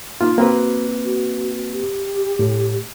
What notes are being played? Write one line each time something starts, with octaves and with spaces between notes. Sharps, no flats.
A#3 D#4 F4
A#3 C4 F#4 B4
F#4
G4
A2